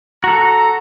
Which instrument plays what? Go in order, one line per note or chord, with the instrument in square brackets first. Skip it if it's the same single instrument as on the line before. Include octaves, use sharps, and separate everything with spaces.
[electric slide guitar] F#4 A4 [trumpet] A#5